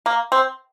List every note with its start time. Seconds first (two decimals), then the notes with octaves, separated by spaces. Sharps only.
0.06 A#3
0.32 C4